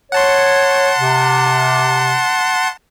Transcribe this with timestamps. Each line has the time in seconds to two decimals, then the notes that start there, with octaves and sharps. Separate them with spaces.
0.12 C#5 F#5 A5 C6
0.99 C3